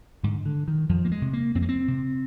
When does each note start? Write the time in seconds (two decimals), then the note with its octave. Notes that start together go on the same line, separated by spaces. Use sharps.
0.23 G#2 D3
0.46 D3
0.68 D#3
0.89 F2 F3
1.05 A#3
1.12 G#3
1.22 C3
1.33 A#3
1.55 F2 C4
1.62 A#3
1.69 C4
1.88 C3